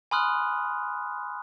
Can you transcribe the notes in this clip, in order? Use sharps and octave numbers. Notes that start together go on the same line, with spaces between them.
G#5 B5 C6 D#6 F6 F#6